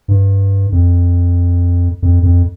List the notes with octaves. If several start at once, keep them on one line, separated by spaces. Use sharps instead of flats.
G2
F2
F2
F2